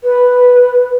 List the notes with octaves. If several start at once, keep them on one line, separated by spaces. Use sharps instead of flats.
B4